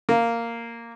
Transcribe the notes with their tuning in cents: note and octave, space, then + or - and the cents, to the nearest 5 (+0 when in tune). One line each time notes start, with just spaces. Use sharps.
A#3 -5